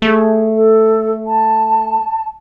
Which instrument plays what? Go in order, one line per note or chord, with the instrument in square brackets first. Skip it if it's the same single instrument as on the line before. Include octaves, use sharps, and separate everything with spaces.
[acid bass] A3 [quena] G#4
[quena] A4
A5